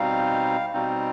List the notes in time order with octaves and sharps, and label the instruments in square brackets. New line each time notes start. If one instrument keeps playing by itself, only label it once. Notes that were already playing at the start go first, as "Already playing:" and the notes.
Already playing: [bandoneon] B2 G3 C4 D#4 F5
B2 G3 C4 D#4